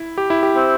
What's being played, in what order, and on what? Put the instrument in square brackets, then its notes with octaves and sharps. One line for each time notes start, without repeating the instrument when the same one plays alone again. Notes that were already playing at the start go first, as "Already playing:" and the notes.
Already playing: [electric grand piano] E4
G4
E4
G4
[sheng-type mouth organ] C4 E4 C5